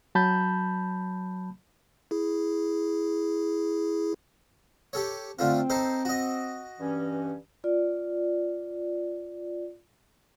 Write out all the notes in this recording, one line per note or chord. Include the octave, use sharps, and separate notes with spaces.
F#3 A5 B5 G6
E4 G#4
G4 A4 C#5
D3 A3 C4 F4
D#4 A4 C5
F#4 D#5
G2 E3 C#4
F4 D5